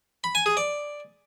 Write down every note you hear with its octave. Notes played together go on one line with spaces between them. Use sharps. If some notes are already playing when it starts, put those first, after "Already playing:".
B5
G#5
G#4
D5